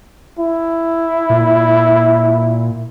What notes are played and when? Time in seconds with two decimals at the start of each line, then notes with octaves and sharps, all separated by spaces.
0.39 E4
1.30 A#2